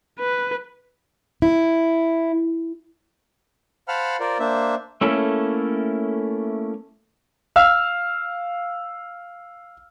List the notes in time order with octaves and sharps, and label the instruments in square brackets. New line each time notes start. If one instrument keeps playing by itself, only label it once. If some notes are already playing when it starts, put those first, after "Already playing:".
[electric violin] B4
[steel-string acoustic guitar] E4
[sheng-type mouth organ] C5 F5 F#5 A5 B5 F6
F4 A#4 C5 D5
A#3 D4 C5 E5
[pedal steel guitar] A3 A#3 C#4 E4 A4
[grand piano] F5 E6 F6